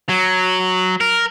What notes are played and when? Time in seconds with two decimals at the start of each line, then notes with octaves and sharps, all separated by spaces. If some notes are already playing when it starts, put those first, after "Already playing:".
0.09 F#3
1.01 A#4